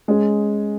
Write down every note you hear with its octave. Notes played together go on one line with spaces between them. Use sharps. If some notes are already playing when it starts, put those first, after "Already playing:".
G#3 C#4 G#4